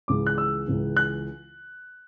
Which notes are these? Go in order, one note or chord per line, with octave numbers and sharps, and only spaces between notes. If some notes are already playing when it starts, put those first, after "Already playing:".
C#2 C#3 E3 D6
F#6
E6
C#2 C#3 E3
F#6